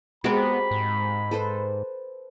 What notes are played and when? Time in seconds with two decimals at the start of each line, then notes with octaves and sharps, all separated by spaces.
0.24 G#3 B3 C4 F#4 G4 A#4 B5
0.71 G#2
1.31 A4 B4 C5